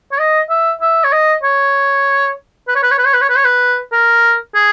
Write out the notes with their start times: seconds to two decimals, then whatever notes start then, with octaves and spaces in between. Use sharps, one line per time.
0.12 C#5
0.19 D#5
0.49 E5
0.81 E5
1.04 C#5
1.12 D#5
1.43 C#5
2.68 B4
2.76 C#5
2.83 B4
2.91 C#5
2.98 B4
3.06 C#5
3.14 B4
3.21 C#5
3.29 B4
3.37 C#5
3.44 B4
3.92 A#4
4.55 G#4